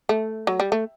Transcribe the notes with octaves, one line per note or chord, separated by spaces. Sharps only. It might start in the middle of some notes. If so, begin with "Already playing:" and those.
A3
F#3
G3
A3